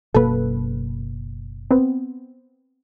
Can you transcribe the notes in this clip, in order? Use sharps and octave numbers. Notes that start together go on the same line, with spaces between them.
F#1 B2 A#3 A4 B4
B3 C4